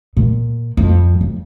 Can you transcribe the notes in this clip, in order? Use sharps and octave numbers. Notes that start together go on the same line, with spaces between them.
A#2
F2
F2